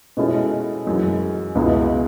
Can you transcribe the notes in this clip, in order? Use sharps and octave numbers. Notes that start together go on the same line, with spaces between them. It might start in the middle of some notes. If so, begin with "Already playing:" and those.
B2 G#3 C#4 E4 A4
F#2 E3 G#3
C#2 B2 G#3 B3 E4